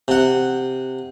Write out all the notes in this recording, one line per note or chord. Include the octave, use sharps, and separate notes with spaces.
C3 F#5